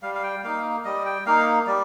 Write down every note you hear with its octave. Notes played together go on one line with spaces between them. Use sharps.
G3 F5
F5
G5
A#3 D#4 F5
G3 D#5
G5
A#3 D#4 F5
G3 D5